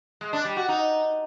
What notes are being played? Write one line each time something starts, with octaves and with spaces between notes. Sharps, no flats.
G#3
D4
G3
F#4
D#4